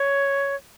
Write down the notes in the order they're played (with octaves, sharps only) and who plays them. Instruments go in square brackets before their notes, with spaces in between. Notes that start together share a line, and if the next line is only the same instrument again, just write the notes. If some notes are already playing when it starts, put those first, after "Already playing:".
Already playing: [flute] C#5